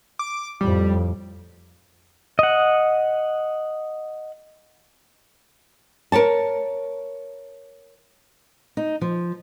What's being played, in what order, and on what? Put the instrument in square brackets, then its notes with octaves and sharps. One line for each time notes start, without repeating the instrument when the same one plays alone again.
[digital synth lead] D6
[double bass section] F2 A2 [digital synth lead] G3
[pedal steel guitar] D#5 F#5
[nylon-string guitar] A#4 B4 C#5 A5
[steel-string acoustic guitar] D#4
F3